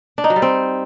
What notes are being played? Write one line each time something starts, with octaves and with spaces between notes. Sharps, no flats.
D4
D#4
F#3
G3
C4